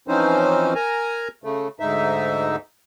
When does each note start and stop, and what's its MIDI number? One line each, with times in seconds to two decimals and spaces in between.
0.08 0.74 52
0.08 0.74 53
0.08 0.74 60
0.08 0.74 61
0.08 0.74 63
0.08 0.74 72
0.75 1.28 70
0.75 1.28 80
0.75 1.28 82
1.44 1.68 49
1.44 1.68 57
1.80 2.56 38
1.80 2.56 44
1.80 2.56 63
1.80 2.56 76